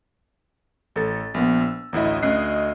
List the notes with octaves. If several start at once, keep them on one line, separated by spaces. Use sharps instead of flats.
A1 A4 A6
A#1 B3
E6
A1 D2 E4 D#5
D2 C#4 D#5 F#6 C7